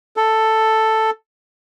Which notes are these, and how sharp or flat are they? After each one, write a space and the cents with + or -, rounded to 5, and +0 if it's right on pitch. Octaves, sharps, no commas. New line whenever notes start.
A4 +5